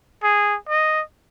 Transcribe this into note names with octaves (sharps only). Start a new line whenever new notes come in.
G#4
D#5